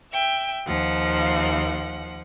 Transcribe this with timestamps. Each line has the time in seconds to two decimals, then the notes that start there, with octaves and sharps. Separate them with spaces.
0.11 E5 G5
0.67 D#2 F3 F#5